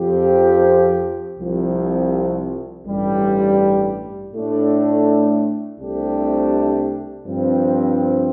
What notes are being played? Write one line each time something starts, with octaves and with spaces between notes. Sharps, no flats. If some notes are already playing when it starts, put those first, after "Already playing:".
Already playing: F2 F3 C4 G4
C2 C3 F3
A1 G2 G3
A2 A3 D4
C2 C3 A3 D4 G4
G2 F3 C4